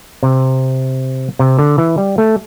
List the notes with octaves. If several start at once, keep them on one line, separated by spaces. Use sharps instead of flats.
C3
C3
D3
E3
G3
A3